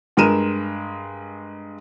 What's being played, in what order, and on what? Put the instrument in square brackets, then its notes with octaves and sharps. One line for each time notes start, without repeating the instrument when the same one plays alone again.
[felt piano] G2 G#3 A#4 D#7 E7